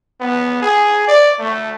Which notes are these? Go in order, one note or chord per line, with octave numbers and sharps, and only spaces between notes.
B3
G#4
D5
A3